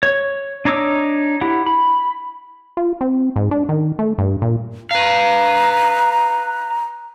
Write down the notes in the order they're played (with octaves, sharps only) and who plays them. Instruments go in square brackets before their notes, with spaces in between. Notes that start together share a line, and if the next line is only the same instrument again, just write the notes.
[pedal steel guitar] C#5
D4 D#4 C#5 D6 E6
E4 G4 F#5
B5
[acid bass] F4
C4
G#2
D4
D#3
A3
G2
A#2
[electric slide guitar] B4 F5 [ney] A#5